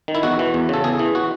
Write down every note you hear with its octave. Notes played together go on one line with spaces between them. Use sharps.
D#3
E4
E2 F#4
E3
E2
C#3 A4
E2 G#4
E3
F#4